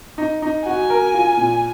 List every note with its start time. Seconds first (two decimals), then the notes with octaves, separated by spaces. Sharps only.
0.18 D#4
0.42 D#4
0.66 F#4 G#5
0.90 A#4
1.14 F4
1.37 A#2